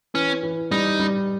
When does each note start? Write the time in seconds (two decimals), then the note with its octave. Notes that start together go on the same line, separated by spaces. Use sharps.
0.14 E3 C#4
0.43 E3
0.71 G3 D#4
1.00 G3